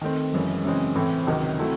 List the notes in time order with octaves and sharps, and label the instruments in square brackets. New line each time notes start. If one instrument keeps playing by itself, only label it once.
[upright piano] D#3 A3 C4
F#1 F#2 E3 G#3
F#2 C#3 E3 G#3 C4
A2 E3 C4
C#2 C3 D#3 F#3
F#3 A3 C4 E4